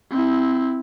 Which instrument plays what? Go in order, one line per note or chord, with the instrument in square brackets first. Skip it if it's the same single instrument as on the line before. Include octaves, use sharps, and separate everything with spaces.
[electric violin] C4 E4